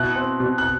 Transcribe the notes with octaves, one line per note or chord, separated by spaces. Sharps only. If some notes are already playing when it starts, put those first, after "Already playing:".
Already playing: B2 E4 F#6
C4
B2
F#6